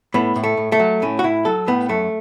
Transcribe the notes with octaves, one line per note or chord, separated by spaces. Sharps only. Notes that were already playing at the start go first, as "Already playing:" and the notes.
A2 B3
A2
A3
A2
A3
F#3
A2 C#4
F#4
A2 E4
F#3 A4
A2 B3
F#2 A3